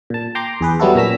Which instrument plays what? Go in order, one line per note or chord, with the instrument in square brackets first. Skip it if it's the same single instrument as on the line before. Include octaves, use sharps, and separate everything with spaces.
[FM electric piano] A#2 A5
G5 A#5 C6 D6
E2 G#4 B4
F#3 G3 B3 E4 F#4 A4
A#2 C#4 A#5 E6 B6